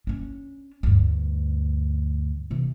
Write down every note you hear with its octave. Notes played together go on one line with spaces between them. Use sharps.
C#4 D4
D2 G2
C3 E3